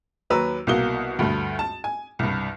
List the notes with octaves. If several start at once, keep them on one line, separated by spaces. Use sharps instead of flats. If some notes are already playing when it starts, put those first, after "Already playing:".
D#2 F#3 B4 A#5 E6
C2 B2 A#3 F#4 D#6 G7
D2 G2 A3
A5
G#5
C2 G2